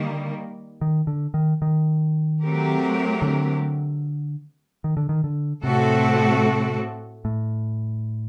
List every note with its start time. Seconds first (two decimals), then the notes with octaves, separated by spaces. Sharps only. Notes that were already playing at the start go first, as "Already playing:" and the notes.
Already playing: D3 D#3 G3 A#3
0.81 D#3
1.07 D3
1.34 D#3
1.62 D#3
2.42 F#3 A3 C4 G4 A#4
3.22 D3
4.84 D#3
4.97 D3
5.09 D#3
5.24 D3
5.64 A2 C3 A3 C4 F#4 A4
7.25 A2